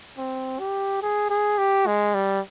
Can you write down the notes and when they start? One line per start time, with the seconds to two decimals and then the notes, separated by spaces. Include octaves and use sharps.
0.18 C4
0.59 G4
1.02 G#4
1.30 G#4
1.58 G4
1.86 G#3
2.14 G3